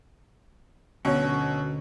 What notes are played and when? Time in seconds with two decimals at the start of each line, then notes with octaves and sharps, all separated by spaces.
1.05 D2 B2 F#3 C#4